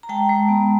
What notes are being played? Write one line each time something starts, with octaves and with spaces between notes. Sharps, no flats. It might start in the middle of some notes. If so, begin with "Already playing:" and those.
A#5
G#3 G5 A5
G#3
B3